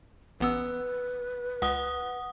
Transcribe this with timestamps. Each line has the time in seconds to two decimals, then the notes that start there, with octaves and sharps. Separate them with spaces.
0.40 A1 B3 B4 E6
1.62 C#2 F#5 D#6